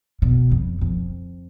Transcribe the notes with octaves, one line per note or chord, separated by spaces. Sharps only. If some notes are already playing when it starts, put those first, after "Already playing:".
B2
F2
F2